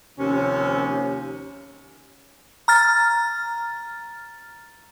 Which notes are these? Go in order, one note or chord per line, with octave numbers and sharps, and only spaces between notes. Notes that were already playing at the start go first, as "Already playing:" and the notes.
D#2 C3 F3 C#4
A#5 F6 A6